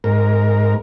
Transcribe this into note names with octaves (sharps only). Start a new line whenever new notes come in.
G#2 A#4